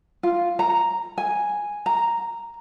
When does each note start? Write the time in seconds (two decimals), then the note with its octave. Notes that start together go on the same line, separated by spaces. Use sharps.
0.23 F4
0.59 A#5
1.18 G#5
1.86 A#5